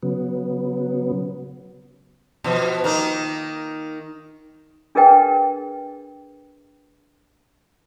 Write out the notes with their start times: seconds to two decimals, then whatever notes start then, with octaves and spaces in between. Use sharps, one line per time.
0.03 C#3 F#3 B3
2.44 B2 F3
2.84 D#3 A#3 D#4
4.95 D4 G#4 A#4 B4 D#5 G5